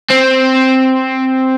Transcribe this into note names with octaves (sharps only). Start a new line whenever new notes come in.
C4